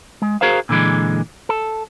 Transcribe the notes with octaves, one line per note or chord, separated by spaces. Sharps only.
G#3
F#4 G#4 A#4 C5 F5
A#2 D3 E3 G#3
A4